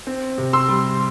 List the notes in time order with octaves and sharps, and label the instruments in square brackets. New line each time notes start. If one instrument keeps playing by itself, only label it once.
[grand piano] C4
C3
C6 E6
G3